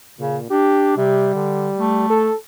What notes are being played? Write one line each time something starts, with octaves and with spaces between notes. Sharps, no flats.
A#2 C#3
D4 G4
C3 G3
D3
A3
A4